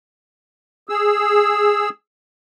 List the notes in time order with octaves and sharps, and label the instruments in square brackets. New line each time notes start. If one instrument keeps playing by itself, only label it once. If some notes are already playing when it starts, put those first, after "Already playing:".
[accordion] G#4 E6